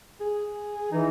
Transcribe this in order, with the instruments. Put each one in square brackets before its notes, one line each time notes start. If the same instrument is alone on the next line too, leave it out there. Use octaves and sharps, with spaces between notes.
[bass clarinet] G#4
[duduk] E3 [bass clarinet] D#4